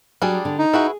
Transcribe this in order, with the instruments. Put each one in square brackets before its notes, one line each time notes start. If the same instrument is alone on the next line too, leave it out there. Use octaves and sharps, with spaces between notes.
[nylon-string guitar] F#3 [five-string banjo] G3 D4 G#4
[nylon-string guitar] D3
[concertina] D#4
[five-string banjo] E4 F#4 B4 [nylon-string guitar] G#4